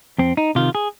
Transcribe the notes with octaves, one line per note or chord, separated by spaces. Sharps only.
F2 C4
D#4
C3 D#3 F4
G#4